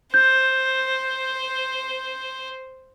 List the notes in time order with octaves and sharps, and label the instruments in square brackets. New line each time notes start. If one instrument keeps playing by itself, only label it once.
[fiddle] C5 [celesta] G6